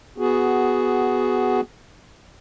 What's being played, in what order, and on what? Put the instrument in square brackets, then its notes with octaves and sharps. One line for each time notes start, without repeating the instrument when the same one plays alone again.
[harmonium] B3 F#4 G#4